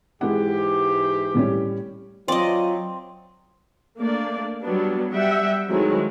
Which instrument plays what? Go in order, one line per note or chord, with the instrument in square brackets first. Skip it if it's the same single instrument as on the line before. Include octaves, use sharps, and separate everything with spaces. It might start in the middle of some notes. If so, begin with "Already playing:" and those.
[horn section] G#2 E3 G4 [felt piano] G#3 E4 F#5
[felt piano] A2 G3 C#4
[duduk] F#3 [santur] C4 [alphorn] F4 [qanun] D5 D#5
[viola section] A3 A#3 D4 D5
F#3 G3 B3 D4
G3 E5 F#5 G5
D#3 F#3 G#3 A3 C4 E4